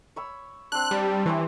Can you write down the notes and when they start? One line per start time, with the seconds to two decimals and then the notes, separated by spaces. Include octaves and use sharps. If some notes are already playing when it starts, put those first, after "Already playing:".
0.16 C#5 B5 E6
0.72 C4 D4 F#6
0.91 G3
1.26 E3 G4 C5 C#5